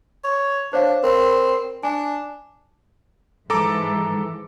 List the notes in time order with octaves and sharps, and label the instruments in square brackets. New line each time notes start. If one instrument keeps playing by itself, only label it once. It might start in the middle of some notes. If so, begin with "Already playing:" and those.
[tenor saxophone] C#5
[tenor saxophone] D4 [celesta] C5 C#5 F5
[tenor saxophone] C4 [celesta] A#4
[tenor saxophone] D4 [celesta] G#5
[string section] G#2 E3 [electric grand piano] A4 A#5 D6